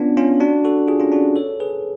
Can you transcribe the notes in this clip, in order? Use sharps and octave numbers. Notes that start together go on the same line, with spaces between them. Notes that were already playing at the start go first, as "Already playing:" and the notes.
Already playing: B3 C#4 D4 F4
C#4 F4
D4 F#4
F#4 A4
F4 G#4
C#4 F4
D4 F#4
A4 C#5
G#4 B4